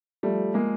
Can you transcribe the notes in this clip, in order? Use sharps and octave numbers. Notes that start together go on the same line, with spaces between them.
F3 G3 A3
G#3 A#3